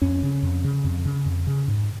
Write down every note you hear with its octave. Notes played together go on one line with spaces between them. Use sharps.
F2 C#4
C#3
F2
C#3
F2
C#3
F2
C#3
G#2